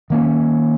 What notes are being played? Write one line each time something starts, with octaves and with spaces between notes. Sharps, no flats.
D#3 A#3 C#4